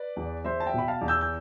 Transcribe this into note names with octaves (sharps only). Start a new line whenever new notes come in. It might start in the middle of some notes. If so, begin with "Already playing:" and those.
Already playing: B4 D5
E2
E2 C5 E5
A5
E5 G5
B2 B5
F5 A5
E2
E6 G6
G6